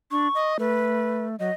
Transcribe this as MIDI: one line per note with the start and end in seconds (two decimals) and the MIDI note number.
0.11 0.28 62
0.11 0.53 85
0.35 0.57 75
0.59 1.36 57
0.59 1.25 71
1.40 1.50 54
1.40 1.54 75